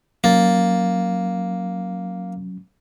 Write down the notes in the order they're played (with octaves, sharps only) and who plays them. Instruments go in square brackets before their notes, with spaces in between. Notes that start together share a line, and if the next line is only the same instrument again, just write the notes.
[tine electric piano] F#3 C#4 A6 [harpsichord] A#3